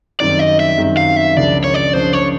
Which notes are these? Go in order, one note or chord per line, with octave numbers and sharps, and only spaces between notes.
F#2 D#3 G3 C4 D5
D#5
E5
F#2 D#3 G3 C4
F5
E5
C#2 C#3 F3 A#3 D4 D5
C#5
D5
C#2 C#3 F3 A#3 D4 C5
C#5